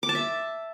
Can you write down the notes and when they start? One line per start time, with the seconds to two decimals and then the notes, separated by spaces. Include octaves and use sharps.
0.03 D6
0.09 A5
0.15 E5